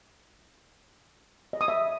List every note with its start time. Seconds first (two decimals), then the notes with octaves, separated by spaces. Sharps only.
1.53 D#5
1.61 D#6
1.68 E5